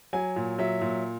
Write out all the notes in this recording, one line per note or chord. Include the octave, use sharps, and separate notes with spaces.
F#3 G#5
A#2
F#3 E5
A#2